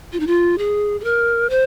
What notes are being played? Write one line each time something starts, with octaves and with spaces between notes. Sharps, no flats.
F4
D#4
F4
G#4
G#4
A#4
C5